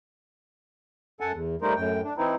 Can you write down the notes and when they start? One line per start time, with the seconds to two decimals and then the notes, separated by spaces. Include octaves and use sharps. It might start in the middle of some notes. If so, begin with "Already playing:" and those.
1.21 F#2 A4 F#5 G#5 A5
1.32 E2
1.62 G3 A3 D#4 A#4 C5
1.76 F#2 A2 G5
2.04 D4
2.17 E3 C4 D#4 E4